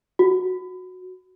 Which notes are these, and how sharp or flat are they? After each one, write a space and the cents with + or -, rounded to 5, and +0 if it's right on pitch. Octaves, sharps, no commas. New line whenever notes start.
F#4 -10